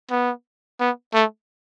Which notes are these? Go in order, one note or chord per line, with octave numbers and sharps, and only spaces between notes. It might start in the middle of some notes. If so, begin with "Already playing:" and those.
B3
B3
A3